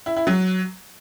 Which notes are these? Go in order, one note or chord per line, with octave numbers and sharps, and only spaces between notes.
E4
E4
F#3